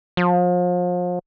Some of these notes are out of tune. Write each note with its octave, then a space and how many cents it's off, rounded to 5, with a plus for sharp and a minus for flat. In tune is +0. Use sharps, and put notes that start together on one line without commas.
F3 +35